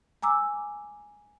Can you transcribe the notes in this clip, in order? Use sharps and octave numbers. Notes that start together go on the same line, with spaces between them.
G#5 A#5 D6 E6